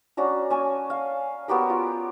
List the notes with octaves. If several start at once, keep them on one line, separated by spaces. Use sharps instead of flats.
C#4 D4 F#4 A#5
C#4 G#5 A5
F5
B3 F#4 G4 A#4
F4